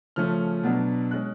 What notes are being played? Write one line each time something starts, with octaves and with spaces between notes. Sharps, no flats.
C#3 F3 A3 C#4 F6
B2 F#3 B3 D4
G#3 C#4 F#6